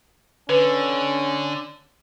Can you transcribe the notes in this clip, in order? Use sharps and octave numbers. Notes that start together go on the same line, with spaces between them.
D3 C#4 B4